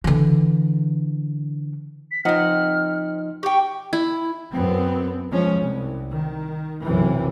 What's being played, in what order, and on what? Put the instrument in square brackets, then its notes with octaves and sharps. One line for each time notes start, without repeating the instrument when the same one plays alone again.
[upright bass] D3 E3
[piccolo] B6
[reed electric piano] F3 D#4 D#5 [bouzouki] C4 F#5 [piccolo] F6
[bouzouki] G4 G5 [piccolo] C#6
[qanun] E4
[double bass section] F#2 B3 C4
F3 G#3 C#4
C2
D#3
B1 F#2 C3 E3